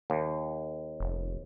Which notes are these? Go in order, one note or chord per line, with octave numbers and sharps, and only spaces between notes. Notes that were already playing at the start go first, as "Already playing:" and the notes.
D#2
F1